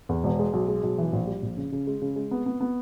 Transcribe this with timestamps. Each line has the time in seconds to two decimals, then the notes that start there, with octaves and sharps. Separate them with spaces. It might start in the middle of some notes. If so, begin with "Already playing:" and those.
0.09 E2
0.24 E1
0.39 G#3
0.53 B1
0.68 G#3
0.83 B1
0.98 E3
1.13 A#1
1.27 G3
1.42 A#1
1.57 C#3
1.72 C#3
1.87 G#3
2.02 C#3
2.16 G#3
2.31 B3
2.46 B3
2.61 B3